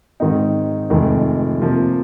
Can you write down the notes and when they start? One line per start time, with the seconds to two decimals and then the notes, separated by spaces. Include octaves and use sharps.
0.20 G#2 D#3 C4 D#4
0.90 F1 F2 D#3 G#3
1.60 C3 F3 A#3